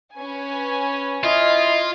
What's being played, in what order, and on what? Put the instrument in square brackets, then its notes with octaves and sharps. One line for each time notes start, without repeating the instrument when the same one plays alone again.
[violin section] C#4 B4 G#5
[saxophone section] E4 D#5 [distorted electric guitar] F4